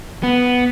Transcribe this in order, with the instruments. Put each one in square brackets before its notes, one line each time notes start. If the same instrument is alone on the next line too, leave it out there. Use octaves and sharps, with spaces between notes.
[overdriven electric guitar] B3